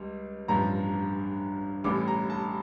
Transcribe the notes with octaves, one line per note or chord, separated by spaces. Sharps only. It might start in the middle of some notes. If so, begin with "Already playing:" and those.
Already playing: C#2 G3
A1 G2 F3 A#5
A1 A2 G3 D6
A#5
A5